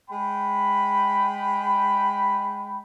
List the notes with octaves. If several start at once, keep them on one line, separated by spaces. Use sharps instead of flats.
G#3 G5 B5